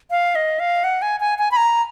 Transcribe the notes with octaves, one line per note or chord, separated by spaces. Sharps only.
F5
D#5
F5
F#5
G#5
G#5
G#5
B5
A#5